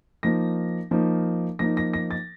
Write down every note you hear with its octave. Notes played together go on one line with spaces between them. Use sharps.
F3 A#3 D#4 A#6
F3 A#3 D#4
F3 A#3 D#4 A#6
A#6
A#6
A6